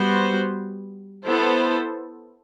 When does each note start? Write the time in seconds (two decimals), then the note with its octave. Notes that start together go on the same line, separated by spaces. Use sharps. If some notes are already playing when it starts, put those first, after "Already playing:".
Already playing: G3 B3 F#4 C5
1.25 B3 E4 A4 C5